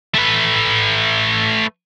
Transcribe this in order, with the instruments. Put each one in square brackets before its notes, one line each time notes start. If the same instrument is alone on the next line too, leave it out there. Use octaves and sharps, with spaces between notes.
[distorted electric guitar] A3 B4